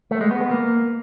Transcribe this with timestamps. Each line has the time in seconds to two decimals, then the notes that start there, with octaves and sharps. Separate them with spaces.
0.11 A3
0.21 G#3
0.31 B3
0.41 B3
0.51 A#3